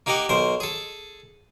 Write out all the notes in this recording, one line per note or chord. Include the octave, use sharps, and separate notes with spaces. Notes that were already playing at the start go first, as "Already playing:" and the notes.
A#3 D#4 G4 A#4 D#5 F#5
B1 A#4 C5
G#4 A4